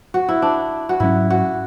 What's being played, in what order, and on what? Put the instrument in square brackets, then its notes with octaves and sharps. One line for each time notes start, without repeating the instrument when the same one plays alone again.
[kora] F#4
E4
D4
F#4
[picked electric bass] G#2 F#3 C#4 [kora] E4
[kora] F#4